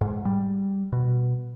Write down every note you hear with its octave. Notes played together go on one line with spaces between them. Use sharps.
G#2
G3
B2